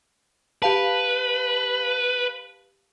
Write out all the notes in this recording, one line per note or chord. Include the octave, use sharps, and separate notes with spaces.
G4 B4 F5 A5